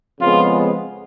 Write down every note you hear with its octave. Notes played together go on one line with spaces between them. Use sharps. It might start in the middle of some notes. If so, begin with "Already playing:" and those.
F2 C#3 G#3 B3 F4